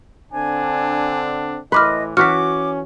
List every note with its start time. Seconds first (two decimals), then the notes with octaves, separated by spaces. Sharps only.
0.32 D3 C4 D4 G#5
1.72 A2 E3 B4 D#5 C6 D6 F6
2.17 E3 C#4 F#4 D6 F6 B6